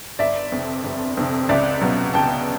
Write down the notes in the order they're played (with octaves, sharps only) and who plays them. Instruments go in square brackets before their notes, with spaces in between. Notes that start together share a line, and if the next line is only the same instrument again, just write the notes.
[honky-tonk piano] G1 [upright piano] D5 E5
[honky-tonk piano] F2 C3
G1
F2 C3
[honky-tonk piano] C#2 [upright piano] D5 E5
[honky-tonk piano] B2 F#3
[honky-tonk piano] C#2 [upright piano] G5 A5